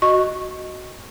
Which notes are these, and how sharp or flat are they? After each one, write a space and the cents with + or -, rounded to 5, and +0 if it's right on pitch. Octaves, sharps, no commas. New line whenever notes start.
F#4 +0 D#5 +0 C#6 -10